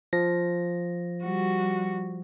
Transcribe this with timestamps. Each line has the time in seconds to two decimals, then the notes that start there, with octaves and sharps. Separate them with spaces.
0.13 F3 A#6
1.23 G3 F#4